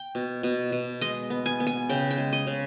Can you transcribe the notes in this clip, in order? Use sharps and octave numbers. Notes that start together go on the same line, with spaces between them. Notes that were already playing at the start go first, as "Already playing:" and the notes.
Already playing: G5
B2
B2
B2
G#3 D#5
B3
G#5
B3
G#5
C#3 G5
G5
G#3
D#5
C#3